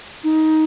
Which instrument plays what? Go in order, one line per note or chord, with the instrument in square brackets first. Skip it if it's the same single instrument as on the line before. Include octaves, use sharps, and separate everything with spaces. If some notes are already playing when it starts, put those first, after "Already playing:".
[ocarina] D#4